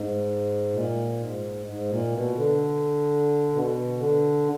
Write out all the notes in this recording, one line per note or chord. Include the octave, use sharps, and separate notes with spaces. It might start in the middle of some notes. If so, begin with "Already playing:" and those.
Already playing: G#2
A#2
G#2
G#2
A#2
B2
D3
B2
D3